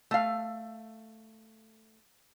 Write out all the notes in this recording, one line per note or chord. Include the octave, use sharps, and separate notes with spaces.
A3 F5